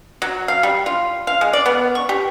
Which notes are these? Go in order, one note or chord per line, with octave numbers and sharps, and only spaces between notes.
F#3
F5
G3
F4
F5
G#3
D5
B3
C#6
G4